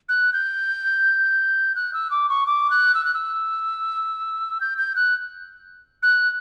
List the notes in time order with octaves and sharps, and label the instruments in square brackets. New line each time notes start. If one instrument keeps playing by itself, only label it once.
[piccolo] F#6
G6
F#6
E6
D6
C#6
D6
F#6
E6
F#6
E6
G6
G6
F#6
F#6